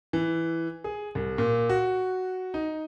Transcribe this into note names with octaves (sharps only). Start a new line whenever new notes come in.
E3
G#4
C2
A#2
F#4
D#4